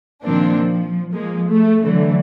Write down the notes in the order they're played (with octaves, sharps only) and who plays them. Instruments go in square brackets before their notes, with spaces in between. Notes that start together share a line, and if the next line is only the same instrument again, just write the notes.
[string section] A#2 D#3 F3 A#3 C4 D4
F3
F3 G#3 A#3
A3
D3 E3 F#3 A3